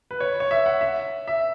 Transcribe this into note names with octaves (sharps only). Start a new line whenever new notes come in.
B4
C#5
C#5
E5
F#5
E5
E5